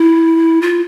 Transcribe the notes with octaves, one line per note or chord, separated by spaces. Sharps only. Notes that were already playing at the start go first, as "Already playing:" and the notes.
Already playing: E4
F4